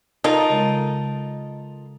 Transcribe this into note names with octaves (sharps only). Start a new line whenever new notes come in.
D#4 F4 A4 A#4
C#3 G#3